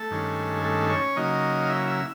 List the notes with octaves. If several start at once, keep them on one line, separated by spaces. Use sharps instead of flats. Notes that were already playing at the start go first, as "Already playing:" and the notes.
Already playing: A3 A4
G2 D#3 G#3 C#4
A3 A4
C#4 C#5
C#3 F#3 A#3 D#4 D#5
F5
E4 E5
E4 E5